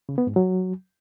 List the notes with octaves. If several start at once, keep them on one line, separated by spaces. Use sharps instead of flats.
C#3
B3
G#2
F#3